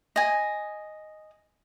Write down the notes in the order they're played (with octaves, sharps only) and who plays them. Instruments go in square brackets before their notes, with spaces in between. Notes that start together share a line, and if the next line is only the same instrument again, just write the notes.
[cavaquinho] D#5 G#5